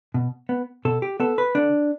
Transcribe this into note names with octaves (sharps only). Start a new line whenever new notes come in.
B2
B3
B2 A4
G4
B3 A4
B4
D3 D4